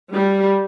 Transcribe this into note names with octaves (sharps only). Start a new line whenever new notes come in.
G3